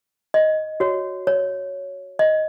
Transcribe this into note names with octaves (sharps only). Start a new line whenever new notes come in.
D#5
F#4 C#5
C#5
D#5